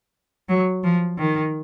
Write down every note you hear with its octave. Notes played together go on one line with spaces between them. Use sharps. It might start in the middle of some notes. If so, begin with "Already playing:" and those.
F#3
F3
D#3